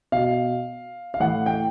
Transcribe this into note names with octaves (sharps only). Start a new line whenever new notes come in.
B2 F5
F5
A2 E3 F#5
G5